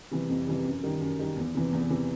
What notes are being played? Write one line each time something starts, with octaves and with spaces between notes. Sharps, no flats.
C3 E3 G3
F2
C3 E3 G3
F#2
D#3 G3
F#2
D#3 G3
E2
C3 E3
E2
C3 E3